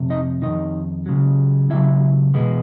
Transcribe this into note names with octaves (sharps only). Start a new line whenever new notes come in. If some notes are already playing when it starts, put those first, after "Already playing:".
Already playing: F2 C3
D#4 D#5
F2 C3 D#3 D#4 D#5
C#2 C#3 F#3
C#2 C#3 F#3 E4 E5
E2 B2 G#3 B3